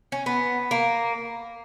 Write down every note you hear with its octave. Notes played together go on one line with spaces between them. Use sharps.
C#4
B3
A#3